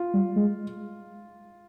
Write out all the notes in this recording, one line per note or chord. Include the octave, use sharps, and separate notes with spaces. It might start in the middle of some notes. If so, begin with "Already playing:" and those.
Already playing: F4
G3
G#3